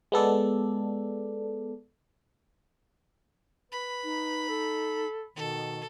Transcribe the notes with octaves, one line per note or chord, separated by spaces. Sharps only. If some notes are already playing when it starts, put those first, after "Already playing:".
G#3 B3 A4 D5
B4 B5
D#4
A4
B2 D#3 A4